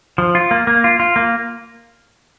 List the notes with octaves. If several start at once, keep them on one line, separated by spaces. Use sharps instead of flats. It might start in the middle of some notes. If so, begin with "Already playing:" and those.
F3
F4
A#3
A#3
F4
F4
A#3